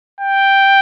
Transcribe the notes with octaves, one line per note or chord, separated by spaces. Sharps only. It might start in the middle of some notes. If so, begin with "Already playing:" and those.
G5